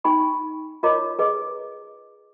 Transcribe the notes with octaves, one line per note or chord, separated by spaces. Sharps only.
D#4 G5 G#5 B5 C#6
F4 A#4 C#5 D#5 A#5 D6
G#4 B4 D#5 G#5 D6